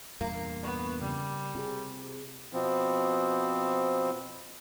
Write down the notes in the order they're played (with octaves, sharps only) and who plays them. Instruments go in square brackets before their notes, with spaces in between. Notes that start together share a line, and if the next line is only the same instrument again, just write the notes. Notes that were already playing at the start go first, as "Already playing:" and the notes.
[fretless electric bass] E2 G2 A#2 [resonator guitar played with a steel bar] A#3
[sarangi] B3 [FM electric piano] D5 C#6
[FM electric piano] C#3 [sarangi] G3
[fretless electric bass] C3 [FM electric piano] F4 G4 G#4
[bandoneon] B2 F3 C4